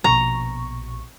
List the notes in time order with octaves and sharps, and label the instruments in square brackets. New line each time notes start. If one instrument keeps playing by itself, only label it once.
[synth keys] A#1 B2 C#6 [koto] A#5